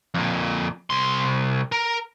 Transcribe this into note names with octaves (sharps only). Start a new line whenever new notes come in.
F2 A#2
C2 C6
A#4